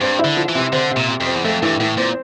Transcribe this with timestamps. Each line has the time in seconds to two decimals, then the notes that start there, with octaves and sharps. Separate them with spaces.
0.01 G2 C4
0.19 E4
0.24 D3
0.37 F3
0.48 E3
0.55 C3
0.73 D3 C4
0.91 C3
0.96 A#2
1.08 C3
1.20 F2
1.26 C4
1.35 E2
1.44 F2 A3
1.62 G2 E3
1.80 A2 E3
1.97 A#2 C4